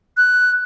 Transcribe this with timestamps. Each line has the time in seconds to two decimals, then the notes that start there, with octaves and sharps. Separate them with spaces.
0.17 F#6